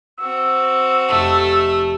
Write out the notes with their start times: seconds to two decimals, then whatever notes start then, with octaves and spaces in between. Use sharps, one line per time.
0.19 C4 F#4 E6
1.09 F1 A3 D#4